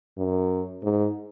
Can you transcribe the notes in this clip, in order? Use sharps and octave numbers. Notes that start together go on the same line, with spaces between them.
F#2
G#2